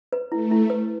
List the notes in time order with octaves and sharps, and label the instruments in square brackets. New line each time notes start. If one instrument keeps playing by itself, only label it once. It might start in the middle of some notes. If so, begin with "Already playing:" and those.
[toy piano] B4
[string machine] A3 [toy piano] E4
[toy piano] E4
B4